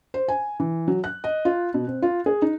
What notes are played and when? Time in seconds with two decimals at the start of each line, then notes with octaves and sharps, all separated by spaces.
0.14 C5
0.28 G#5
0.60 E3
0.88 F#3
1.04 F#6
1.24 D#5
1.45 F4
1.74 B2
1.87 C4
2.02 F4
2.26 G#4
2.42 D#4